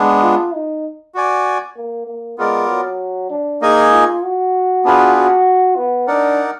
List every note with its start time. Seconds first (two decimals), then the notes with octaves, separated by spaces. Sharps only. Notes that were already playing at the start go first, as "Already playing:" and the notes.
Already playing: G#3 B3 D4
0.23 F4
0.54 D#4
1.15 F#4 D5 G#5
1.76 A#3
2.07 A#3
2.38 G#3 B3 F4 A#4 D5
2.69 F#3
3.30 D4
3.61 A#3 D#4 G#4 D#5 G#5
3.92 F4
4.23 F#4
4.85 B3 D4 F4 G#4 B4
5.15 F#4
5.77 B3
6.07 D4 D#4 A#4 D5 F#5